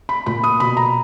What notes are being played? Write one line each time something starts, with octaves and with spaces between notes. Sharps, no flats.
B5
A#2 B5
D#6
B2 B5
A#5